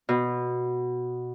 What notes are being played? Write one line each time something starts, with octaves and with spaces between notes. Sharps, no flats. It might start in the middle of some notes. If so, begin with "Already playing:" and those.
B2